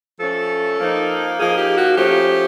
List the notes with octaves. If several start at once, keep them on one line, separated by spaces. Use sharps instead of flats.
F3 A3 C#4 A4
F3 A#3 D#4
F3 A#3 D#4 G#4
G4
F#4
F3 A3 C#4 G4